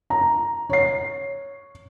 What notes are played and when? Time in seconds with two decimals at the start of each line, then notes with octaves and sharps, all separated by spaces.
0.10 A#5
0.70 C#5 C7